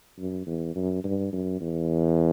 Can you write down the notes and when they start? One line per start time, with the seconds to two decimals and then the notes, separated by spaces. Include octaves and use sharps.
0.19 F#2
0.46 E2
0.75 F#2
1.04 G2
1.33 F#2
1.61 E2